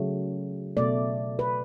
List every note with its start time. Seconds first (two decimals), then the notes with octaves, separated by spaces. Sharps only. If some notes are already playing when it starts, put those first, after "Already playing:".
Already playing: C#3 F#3 A3
0.77 B2 A3 D5
1.39 B4